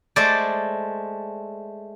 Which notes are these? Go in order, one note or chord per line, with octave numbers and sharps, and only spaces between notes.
G#3 A3 A4 C5 D5